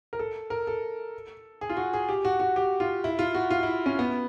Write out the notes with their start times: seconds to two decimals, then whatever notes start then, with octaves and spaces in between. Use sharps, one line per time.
0.13 A#4
0.19 A4
0.50 A#4
0.67 A4
1.61 G#4
1.69 F4
1.77 F#4
1.93 G#4
2.09 G4
2.25 F#4
2.40 F#4
2.56 G4
2.80 F4
3.04 E4
3.19 F4
3.34 F#4
3.50 F4
3.63 E4
3.86 C#4
3.99 B3